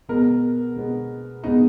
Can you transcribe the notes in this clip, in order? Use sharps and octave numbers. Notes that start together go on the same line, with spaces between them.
B2 G#3 B3 A#4
B2 G#3 B3
B2 G#3 B3 D#4